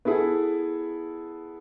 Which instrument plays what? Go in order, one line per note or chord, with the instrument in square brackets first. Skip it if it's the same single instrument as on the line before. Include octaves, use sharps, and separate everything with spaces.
[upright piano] B3 E4 G#4 A4